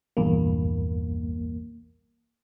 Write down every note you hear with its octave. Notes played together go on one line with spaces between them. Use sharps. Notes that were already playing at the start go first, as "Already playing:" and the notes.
A#1 E2 G2 A#3